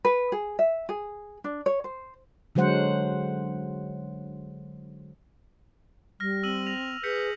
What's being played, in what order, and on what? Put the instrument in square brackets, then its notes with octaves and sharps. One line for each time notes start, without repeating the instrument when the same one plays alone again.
[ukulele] B4
G#4
E5
G#4
D4
C#5
C5
[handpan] D3 F#3 G#3 C5 F#5
[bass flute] G3 [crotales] F6 A#6
[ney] C4 [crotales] E6 D#7 F#7
[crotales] A#6 F7
[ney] G#4 [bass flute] B4 [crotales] G6 B6 C#7